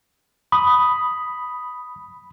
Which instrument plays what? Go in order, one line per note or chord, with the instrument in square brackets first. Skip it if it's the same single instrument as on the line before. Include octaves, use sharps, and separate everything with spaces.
[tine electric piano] B5 [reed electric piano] D#6